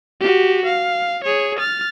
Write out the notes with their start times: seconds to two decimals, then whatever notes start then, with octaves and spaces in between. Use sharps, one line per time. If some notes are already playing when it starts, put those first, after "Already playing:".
0.21 F#4 G4
0.66 F5
1.24 G#4 C#5
1.59 F6 A6